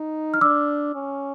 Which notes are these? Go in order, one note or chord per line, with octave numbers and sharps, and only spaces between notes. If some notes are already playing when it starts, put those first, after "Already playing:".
Already playing: D#4
F6
D4 D6 E6
C#4